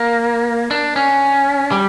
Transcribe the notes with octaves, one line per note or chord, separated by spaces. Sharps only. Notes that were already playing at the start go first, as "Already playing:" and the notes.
Already playing: A#3
D4
C#4
G3